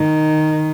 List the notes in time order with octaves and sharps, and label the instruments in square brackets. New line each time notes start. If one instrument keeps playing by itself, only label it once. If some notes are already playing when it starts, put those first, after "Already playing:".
Already playing: [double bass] D#3